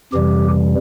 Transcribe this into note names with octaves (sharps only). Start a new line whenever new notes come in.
F2 C3 E3 G3 G4